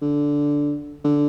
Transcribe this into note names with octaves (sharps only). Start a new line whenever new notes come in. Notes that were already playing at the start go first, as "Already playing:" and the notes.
D3
D3